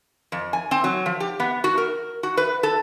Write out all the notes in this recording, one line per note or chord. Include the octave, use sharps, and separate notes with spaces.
F2
G#5
C4
F#3
F3
G4
B3
F#4
A#4
F#4
B4
A4